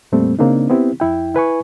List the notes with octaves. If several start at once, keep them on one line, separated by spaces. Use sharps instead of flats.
F2 A#2 G3 A3 A#3 C4
C#3 A#3 C4 D4 D#4
B3 C4 E4 G4
F2 E4 G5
E4 B4 G#5 C#6